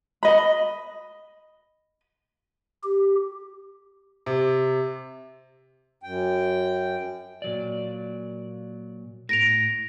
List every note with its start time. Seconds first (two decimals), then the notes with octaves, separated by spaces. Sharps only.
0.23 D#5 B5
2.83 G4
4.26 C3
6.03 F#2 G5
7.42 A#2 F#3 D5
9.29 A2 A#5 A#6 D7 F7